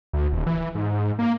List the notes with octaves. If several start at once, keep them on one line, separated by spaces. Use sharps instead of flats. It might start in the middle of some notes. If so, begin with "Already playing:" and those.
D2
D#1
E3
G#2
A#3